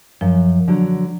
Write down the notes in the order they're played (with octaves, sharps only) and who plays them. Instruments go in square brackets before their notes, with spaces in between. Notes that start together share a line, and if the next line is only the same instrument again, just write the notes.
[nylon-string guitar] F#2 [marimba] F3
[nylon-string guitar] D3 F#3